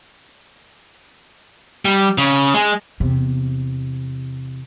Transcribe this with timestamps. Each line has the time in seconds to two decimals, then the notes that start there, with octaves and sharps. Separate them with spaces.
1.85 G3
2.18 C#3
2.54 G#3
3.00 E2 C3